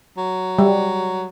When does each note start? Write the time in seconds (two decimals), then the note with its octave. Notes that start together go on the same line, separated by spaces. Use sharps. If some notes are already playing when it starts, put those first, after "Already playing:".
0.17 F#3
0.59 G3